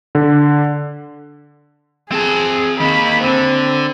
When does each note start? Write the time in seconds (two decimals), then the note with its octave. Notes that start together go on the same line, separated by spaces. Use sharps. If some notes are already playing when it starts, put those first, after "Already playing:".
0.15 D3
2.12 C4 G#4 A5
2.80 D#3 A#3 B5
3.23 D3 C4